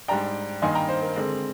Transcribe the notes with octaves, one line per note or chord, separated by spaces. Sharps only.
G#2 G3 D4 G5 A#5
G2 D#3 A#3 D#4 G#5 C6
G5 A#5
C5
A#4
D3 G#3 C4